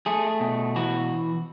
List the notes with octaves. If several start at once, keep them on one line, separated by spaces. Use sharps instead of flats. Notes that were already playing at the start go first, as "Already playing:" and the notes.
A3 G#4
B2
E3 F#4